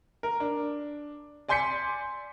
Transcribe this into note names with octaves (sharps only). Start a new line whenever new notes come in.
A#4
D4
D5 G#5 C6 G6 B6 C#7